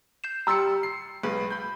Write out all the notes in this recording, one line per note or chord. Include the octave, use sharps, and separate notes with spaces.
G6 C7 E7
G3 A#5 C6 E6 A6 C#7
C7
B1 G#3 B4
B5 G6